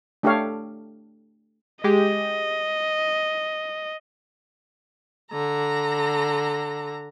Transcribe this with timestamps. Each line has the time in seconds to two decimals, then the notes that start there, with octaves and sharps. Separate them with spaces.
0.23 A3 D4 G4 A4 C#5 F5
1.84 G#3 G4 D#5
5.31 D3 A#5